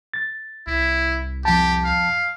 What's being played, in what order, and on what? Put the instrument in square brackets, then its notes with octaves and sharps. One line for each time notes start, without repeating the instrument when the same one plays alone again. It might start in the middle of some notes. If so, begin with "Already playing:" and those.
[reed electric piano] A6
[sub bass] C2 [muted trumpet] E4
[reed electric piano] F2 A5 [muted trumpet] G4
[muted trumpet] F5